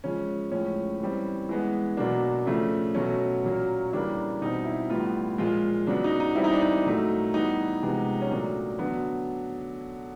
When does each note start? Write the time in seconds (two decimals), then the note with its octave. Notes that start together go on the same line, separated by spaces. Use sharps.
0.04 C#3 F3 G#3 C#4
0.51 A2 F3 G#3 C#4
1.00 E3 G3 C4
1.49 E3 G#3 B3
1.97 B2 F#3 A#3 D4
2.46 C#3 F3 A3
2.95 B2 F#3 A3 C#4
3.44 A#2 F#3 A#3
3.93 C#3 E3 G3 A#3 D4
4.41 B2 G3 C4 D#4
4.65 E4
4.90 A2 E3 G3 B3 F4
5.38 A#2 F3 G#3 F4
5.87 C#3 F#3 B3 D4
6.04 D#4
6.20 D#4
6.35 E3 G3 C4 E4
6.44 D#4
6.53 D4
6.61 D#4
6.85 A#2 F#3 A3
7.34 E3 G3 B3 D#4
7.83 C3 F3 G#3 B3
8.22 C#4
8.31 A#2 F#3 A3 D4
8.79 D3 F#3 B3